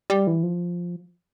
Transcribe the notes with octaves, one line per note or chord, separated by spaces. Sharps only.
G3
E3
F3